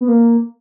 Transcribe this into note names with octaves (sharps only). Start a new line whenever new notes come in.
B3
A#3